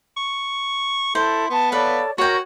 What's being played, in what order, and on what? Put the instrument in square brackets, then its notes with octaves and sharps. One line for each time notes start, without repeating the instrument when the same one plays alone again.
[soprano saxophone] C#6
[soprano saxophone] E4 [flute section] A4 [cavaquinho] C5
[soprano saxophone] B3 [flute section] A5
[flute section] A4 C#5 D5 [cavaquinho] B4 F5
[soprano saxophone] F#4 [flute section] A#4 [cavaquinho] C#5 G5